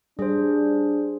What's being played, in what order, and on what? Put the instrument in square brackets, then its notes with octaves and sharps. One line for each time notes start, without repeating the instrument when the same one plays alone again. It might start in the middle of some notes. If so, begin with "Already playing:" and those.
[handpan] G3 [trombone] D4 [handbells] G#4 C5